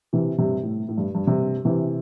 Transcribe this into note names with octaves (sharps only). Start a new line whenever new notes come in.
C3 E3
G2 C3
A2
A2
G2
G2
G2 C3
C3 E3